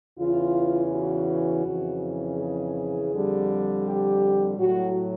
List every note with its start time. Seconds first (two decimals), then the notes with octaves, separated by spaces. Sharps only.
0.18 E2 C#3 E3 F4
0.92 F#4
1.65 F2 C#3 E3
2.38 G#4
3.10 F2 D3 G3
3.84 G4
4.57 A2 F#3 F#4